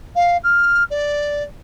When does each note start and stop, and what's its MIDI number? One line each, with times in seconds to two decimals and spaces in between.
0.16 0.37 77
0.44 0.84 89
0.90 1.44 74